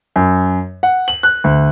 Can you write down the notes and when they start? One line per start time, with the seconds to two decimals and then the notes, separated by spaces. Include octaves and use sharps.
0.16 F#2
0.83 F#5
1.08 F#7
1.23 F#6
1.44 D2